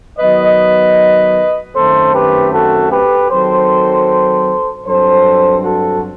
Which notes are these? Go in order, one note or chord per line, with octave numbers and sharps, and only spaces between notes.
D#3 F#3 B3 B4 D#5
F#2 D#3 A3 C4 A4 C5
G4 B4
F#4 A4
G4 B4
D#3 F#3 C4 A4 C5
G2 F#3 C4 A4 C5
F#4 A4